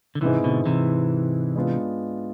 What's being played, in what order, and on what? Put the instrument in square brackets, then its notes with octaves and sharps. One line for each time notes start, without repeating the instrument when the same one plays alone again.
[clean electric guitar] D3
[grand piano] G#2 G#3 C4 E4 B4 [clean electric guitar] C3 E3
[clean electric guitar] B2 D3
C3 E3
[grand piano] G#3 B3 D4 F4 B4